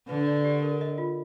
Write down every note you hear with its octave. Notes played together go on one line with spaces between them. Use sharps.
D3 B4
D5
G4
A#4
D#5
F4